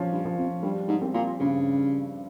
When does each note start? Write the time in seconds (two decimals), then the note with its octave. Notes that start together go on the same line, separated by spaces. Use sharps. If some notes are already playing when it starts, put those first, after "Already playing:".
Already playing: F3 C#4
0.12 G2
0.25 F3
0.37 F2
0.63 G2 G3
0.88 G#2
1.02 C4
1.14 A#2
1.40 G2 C#3
1.78 G2